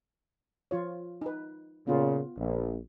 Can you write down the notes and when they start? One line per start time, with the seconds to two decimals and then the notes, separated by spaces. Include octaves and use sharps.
0.71 F3 F4 C#5
1.22 D#4 B4
1.87 A#2 C#3 B3 F4
2.37 A#1